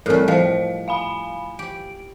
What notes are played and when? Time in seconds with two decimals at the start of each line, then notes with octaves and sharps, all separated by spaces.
0.06 A2 G3 C4 A4 A#4
0.28 F3 D#5 F5
0.88 F5 G#5 B5
1.59 G4 D7